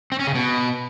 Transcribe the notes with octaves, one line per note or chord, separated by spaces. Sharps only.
C4
C#4
C#3
B2